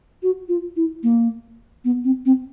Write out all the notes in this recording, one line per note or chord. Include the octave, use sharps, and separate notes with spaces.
F#4
F4
E4
A#3
B3
C4
C4